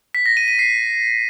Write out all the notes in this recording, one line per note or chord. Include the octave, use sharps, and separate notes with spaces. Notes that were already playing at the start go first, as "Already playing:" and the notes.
B6
A#6
D#7
D#7
C7